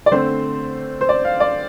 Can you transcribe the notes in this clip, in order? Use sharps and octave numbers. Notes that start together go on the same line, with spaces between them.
D5
D3 A3 C4 C5
C5
D5
F5
D5